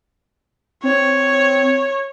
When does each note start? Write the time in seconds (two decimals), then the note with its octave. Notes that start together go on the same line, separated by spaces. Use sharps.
0.83 C4 C#5